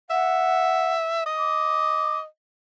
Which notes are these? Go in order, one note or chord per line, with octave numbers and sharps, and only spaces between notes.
E5 F#5
D#5
D6